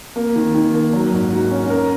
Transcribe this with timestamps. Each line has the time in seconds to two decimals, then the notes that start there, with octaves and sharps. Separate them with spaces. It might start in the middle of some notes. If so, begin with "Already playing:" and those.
0.16 A#3
0.36 D#3
0.55 D#3
0.74 A#3
0.93 F#3
1.13 G#2
1.32 F#4
1.51 C#4
1.70 A#4